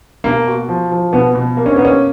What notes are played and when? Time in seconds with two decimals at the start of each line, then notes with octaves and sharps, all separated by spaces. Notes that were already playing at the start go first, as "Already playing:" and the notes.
0.24 B2 A#3
0.47 F#4
0.69 F3
0.91 F3
1.13 B2 B3
1.35 B2
1.57 A#3
1.66 C#4
1.76 A#3 B3
1.85 C#4